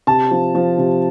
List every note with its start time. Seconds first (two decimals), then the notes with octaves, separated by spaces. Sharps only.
0.07 C3 A5
0.31 F3
0.55 F3
0.78 C3